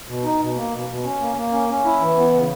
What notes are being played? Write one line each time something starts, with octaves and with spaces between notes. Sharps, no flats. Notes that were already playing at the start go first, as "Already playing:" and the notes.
B2
D#4
B2
A#3
B2
B2
C#4
A#3
A#3
C#4
C#4
E4
E3
B3
C#3